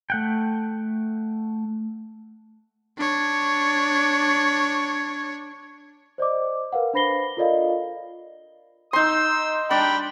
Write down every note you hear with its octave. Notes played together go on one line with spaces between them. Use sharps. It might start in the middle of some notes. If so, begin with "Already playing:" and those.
A3 F#5 G5
D4 C#5
C5 D5 D#5 D6
A#4 B4 F5 F#5
D4 C5 B5 A#6 C7 G7
F4 A4 A#4 D5 D#5 F5
D#4 C6 E6
D4 G5 B5